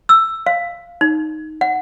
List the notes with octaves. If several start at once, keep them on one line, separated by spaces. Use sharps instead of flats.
E6
F5
D#4
F#5